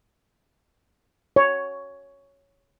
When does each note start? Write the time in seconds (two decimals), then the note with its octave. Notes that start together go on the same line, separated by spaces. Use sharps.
1.36 C#5